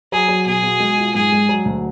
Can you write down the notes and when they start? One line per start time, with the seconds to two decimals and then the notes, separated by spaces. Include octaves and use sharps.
0.12 F#3 G#4
0.28 F#3
0.46 B2 G#4
0.63 B2
0.80 G#3
0.98 F4
1.14 G#2 G#4
1.32 G#3
1.49 F#3
1.65 D2